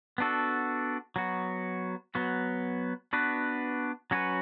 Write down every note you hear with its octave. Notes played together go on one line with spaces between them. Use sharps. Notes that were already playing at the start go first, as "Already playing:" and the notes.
B3 D4 F#4 A4
F#3 B3 F#4
F#3 B3 F#4
B3 D4 F#4 B4
F#3 C#4 F#4 B4